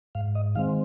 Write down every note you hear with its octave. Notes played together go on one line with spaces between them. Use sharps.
G#2 F5
D#5
D#3 G#3 C4 F5